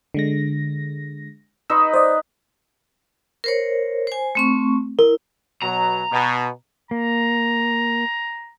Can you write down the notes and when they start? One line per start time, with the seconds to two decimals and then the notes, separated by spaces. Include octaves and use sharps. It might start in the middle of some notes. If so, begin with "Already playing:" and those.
0.14 D3 G#3 A#6
1.70 D#4 B4 D#5 C6 C#6 E6
1.93 C5 D5 D#5
3.44 A#4 C5 C#5
4.07 C5 G#5
4.35 A3 C4 C#6
4.99 E4 A#4
5.62 B2 F#3 A#5
6.12 B2
6.91 A#3 A#5